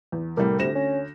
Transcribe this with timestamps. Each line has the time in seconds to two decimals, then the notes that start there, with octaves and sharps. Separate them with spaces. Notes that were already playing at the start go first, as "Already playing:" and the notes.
0.12 E2
0.37 C2 A2 G3 A#4
0.59 D2 C3 A#6 E7
0.75 C#4